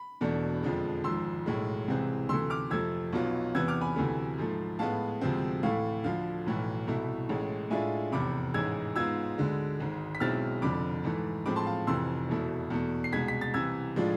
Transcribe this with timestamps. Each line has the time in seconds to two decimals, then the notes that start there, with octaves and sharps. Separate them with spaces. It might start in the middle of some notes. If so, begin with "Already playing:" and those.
Already playing: B5
0.21 E1 E2 B2 A3 D4
0.63 F2 D3 F3 G#3
1.04 G#1 G#2 F3 C6 E6
1.46 B1 A2 G#3
1.88 C2 C3 E3 G#3 C4
2.29 D2 C3 E3 A3 C6 E6
2.50 D6 F6
2.70 F2 C3 F3 A3 E6 G#6
3.13 B1 B2 B3 F4
3.55 E2 C3 E3 B3 E6 G#6
3.68 D6 F6
3.81 G#5 B5
3.96 D2 C3 E3 A3
4.38 G#2 F3 A3
4.79 A2 G#3 B3 F5 A5
5.21 D2 C3 F3 G#3 C4
5.63 A2 E3 A3 F5
6.04 D2 D3 F3 F5
6.46 B1 A2 E3
6.87 C2 B2 A3 E4
7.29 A1 A2 G#3
7.70 A2 G#3 D4 F4 E5 G#5
8.12 F1 E2 C3 B5 D6
8.54 A1 G#2 E3 G#3 E6 G#6
8.96 G#2 G#3 B3 F4 E6 G#6
9.38 D2 D3 G#3
9.80 G#1 G#2 G#3
10.15 B6
10.20 B1 B2 G#3 C4 E4 F6 A6
10.62 F1 F2 D3 B5 D6
11.04 G#2 E3 A3
11.46 A2 F3 G#3 C4 B5 D6
11.56 A5 C6
11.66 F5 A5
11.87 F1 F2 C3 E3 A3 C6 E6
12.29 E1 E2 B2 A3 E4
12.70 E2 B2 A3
13.04 C7
13.13 C2 B2 G#3 G#6 B6
13.28 B6
13.41 A6
13.54 C2 C3 E3 E6 G#6
13.96 A2 F3 G#3 D4 F4